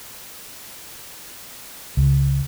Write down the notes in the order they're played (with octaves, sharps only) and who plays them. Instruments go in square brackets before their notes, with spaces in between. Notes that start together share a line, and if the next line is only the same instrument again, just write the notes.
[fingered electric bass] C#2